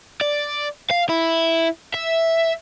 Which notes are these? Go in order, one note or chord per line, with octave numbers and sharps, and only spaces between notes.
D5
F5
E4
E5